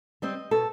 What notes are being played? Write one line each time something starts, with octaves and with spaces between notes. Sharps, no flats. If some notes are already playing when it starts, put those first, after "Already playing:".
G3 C4 D#5
B2 A4